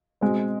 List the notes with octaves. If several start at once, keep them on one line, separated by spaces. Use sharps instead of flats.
B2 G#3 C4